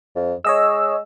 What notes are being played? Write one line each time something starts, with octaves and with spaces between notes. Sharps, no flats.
F2
G#3 C#5 D#5 E6